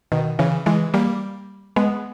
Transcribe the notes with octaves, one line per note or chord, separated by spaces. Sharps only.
B2 D#3
C#3 E3
E3 G#3
G3 A#3
G#3 B3